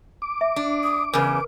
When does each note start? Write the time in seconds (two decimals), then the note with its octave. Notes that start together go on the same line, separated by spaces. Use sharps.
0.22 D6
0.41 E5
0.56 D4
0.83 D#6
1.14 E2 C#3 A#4 B4 G#5